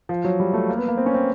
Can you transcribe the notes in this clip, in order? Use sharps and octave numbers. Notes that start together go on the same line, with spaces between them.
F3
F#3
G3
A3
A#3
B3
A#3
C4
C#4
C4